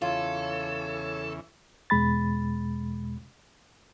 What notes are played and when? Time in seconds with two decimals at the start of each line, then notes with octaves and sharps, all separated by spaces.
0.02 E2 C#3 E3 F4 A4 C#5
1.90 E2 B2 G#3 B5 A6